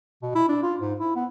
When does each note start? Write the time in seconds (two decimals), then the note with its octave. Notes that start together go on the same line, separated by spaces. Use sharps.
0.22 B2
0.35 E4
0.49 D4
0.63 F4
0.80 G#2
1.00 E4
1.16 B3